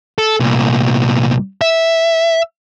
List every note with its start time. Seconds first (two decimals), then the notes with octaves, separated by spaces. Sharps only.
0.18 A4
0.40 C2 A#2
1.61 E5